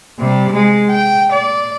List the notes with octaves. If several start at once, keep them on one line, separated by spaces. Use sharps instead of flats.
C3 G3
G#3
G5
D5